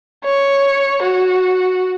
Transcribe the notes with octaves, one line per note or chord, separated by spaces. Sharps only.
C#5
F#4